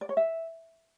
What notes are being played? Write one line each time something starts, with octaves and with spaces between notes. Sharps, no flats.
D5
C#5
E5